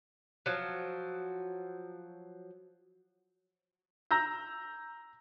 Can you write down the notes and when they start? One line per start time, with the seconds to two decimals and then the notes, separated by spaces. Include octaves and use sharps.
0.46 F3 F#3
4.11 A#5 E6 G6 A#6